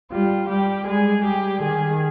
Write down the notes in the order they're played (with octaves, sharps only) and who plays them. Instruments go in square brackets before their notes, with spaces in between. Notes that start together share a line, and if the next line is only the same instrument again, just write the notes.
[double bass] G3 [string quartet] F4
[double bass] G3 [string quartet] G4
[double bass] G#3 [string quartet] G#4
[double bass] G3 [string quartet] G4
[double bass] D#3 [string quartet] G#4